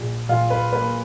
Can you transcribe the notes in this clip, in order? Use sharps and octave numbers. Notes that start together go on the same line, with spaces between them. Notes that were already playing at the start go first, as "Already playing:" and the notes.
Already playing: A#1
A#2 F4
B4
A#3 B4